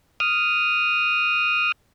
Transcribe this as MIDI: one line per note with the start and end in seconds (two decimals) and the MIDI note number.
0.20 1.72 87
0.20 1.72 89